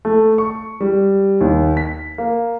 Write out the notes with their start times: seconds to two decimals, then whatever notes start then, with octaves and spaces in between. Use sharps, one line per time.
0.05 A3
0.38 C#6
0.81 G3
1.41 D#2
1.77 B6
2.18 A#3